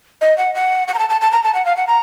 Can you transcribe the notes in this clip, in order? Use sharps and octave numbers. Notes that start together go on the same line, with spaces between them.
D#5
F#5
F#5
F#5
A#5
A5
A5
A5
A#5
A5
F#5
F5
F#5
A#5